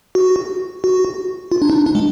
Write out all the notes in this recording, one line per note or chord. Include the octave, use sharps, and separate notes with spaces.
F#4
F#4
F4
D4
D#4
D4
G#3